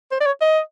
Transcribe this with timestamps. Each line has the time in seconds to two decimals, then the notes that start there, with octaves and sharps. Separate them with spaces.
0.11 C5
0.20 D5
0.26 C#5
0.41 D#5